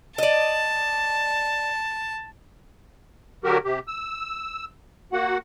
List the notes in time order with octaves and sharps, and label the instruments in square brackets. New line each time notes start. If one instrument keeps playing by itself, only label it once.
[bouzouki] D5 D#5 [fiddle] A5
[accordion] D3 F#3 F#4 G4 A#4
C3 G4
E6
A#3 F#4 F#5